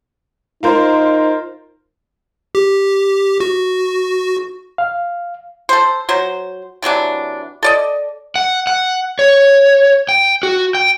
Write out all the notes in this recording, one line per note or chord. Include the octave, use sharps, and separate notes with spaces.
D#4 F4 A#4 C5
G4
F#4
F5
A4 C5
F#3 C5
C3 E3 F#3 D4
A4 D5 D#5
F#5
F#5
C#5
G5
F#4
G5